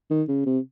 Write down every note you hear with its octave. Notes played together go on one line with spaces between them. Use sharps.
D#3
C#3
C3